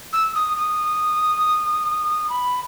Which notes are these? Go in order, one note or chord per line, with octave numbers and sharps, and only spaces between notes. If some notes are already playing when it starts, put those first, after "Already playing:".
E6
D#6
D#6
B5